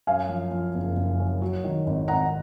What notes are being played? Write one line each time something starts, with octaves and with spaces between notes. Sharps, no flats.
F#2 F5 G#5
F3
F3
F#1
F#1
F#2
F#3
D#3
G#1
G#1 F#5 A#5